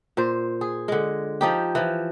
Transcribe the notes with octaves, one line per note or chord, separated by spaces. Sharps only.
A#2 C5
G#4
D3 G#3
F3 D#4 G4
E3 F3